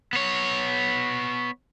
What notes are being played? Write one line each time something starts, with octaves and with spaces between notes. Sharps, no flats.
B3 C#5